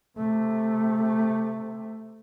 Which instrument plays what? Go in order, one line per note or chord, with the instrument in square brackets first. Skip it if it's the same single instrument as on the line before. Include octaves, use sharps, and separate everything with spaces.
[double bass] C3 A3